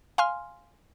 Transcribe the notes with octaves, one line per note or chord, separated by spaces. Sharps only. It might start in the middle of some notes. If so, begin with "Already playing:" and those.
F5 G#5 C6 F6